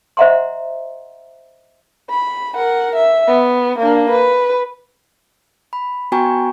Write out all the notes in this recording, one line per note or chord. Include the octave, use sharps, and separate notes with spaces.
C5 D#5 E5 F#5 A#5 C6
B5
A#4 F#5
E5
B3
A#3 D4
B4
B5
B3 F#4 G5 G#5 A#5 C#6